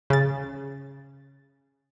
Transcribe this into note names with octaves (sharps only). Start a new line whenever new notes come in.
C#3 A6